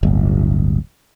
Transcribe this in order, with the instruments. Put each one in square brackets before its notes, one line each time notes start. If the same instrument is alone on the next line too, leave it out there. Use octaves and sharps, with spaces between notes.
[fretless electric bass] D1 G1